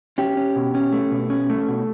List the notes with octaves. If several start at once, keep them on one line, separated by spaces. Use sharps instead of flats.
C#4 G4
C#4
B2
C#4
A3
B2
C#4
A3
B2